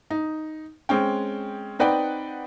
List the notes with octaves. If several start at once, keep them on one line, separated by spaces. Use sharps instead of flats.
D#4
G#3 C4 C#4 G5
C4 D#4 B4 D5 F#5 G5